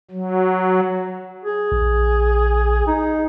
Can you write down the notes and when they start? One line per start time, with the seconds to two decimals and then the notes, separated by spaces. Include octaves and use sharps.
0.11 F#3
1.44 G#4
1.72 A#1
2.87 D#4